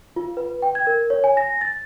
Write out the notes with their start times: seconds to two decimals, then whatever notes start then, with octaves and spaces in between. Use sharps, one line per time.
0.16 F4
0.37 B4
0.62 G5
0.75 G#6
0.87 A#4
1.10 C#5
1.24 G#5
1.37 A#6
1.61 A6